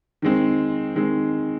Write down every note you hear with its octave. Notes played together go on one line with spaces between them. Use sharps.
D#3 G#3 C4
D#3 G#3 C4